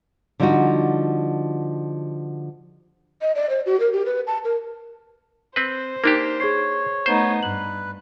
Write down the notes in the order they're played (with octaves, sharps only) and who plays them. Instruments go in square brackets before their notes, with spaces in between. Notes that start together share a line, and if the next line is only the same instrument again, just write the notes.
[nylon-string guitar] D3 F3 G3 D#4 F4 F#4
[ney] D#5
D5
C5
F#4
A#4
G4
B4
A5
A#4
[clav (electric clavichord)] C4 B4 [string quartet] C5
[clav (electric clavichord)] A#3 D4 G4 [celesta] D#4 A#4
[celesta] G#4 G#6 C7 [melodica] C#5
[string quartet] A3 B3 D#4 [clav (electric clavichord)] C5
[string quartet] G2 [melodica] B4 [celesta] F#7